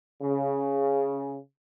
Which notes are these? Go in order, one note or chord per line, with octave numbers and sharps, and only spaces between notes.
C#3